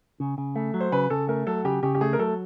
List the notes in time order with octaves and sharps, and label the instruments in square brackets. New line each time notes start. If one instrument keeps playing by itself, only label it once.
[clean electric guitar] C#3
C#3
A3
F#3
[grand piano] C5
[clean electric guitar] C#3 [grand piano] B4
[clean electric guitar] C#3 [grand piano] A4
[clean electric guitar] A3 [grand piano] A#4
[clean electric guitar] F#3 [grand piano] A4
[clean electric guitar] C#3 [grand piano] G4
[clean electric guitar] C#3 [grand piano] G4
[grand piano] G4
[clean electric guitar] A3 [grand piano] G#4
[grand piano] A#4
[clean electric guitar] F#3 [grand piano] A4